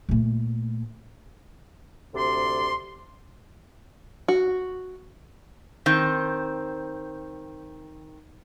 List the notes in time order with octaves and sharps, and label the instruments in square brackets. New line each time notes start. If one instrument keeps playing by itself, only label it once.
[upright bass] A#2 A3
[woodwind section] D2 C3 D5 C6
[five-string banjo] F#4
[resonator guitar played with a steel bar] D#3 C4